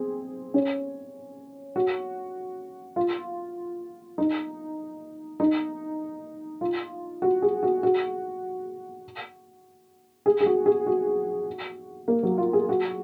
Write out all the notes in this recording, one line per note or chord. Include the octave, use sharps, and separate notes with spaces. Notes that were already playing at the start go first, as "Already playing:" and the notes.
Already playing: C4 G#4
C#4
F#4
F4
D#4
D#4
F4
F#4
G#4
F#4
F#4
G#4
G#4
F#4
G#4
F#4
A#3
F#3
F4
G#4
F#4